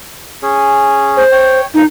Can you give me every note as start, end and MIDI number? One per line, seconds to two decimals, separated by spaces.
0.43 1.23 61
0.43 1.23 68
1.17 1.60 72
1.32 1.65 73
1.32 1.65 79
1.74 1.83 43
1.74 1.83 46
1.74 1.85 63